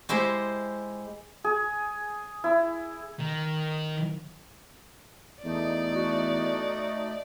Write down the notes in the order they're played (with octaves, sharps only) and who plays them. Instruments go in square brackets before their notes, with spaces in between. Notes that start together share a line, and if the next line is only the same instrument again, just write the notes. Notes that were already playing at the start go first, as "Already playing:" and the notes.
[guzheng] G#3 E4 G4 C5
[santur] G#4
E4
[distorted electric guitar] D#3
[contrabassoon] E2 [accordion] A3 D#4 [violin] D5
[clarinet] F#4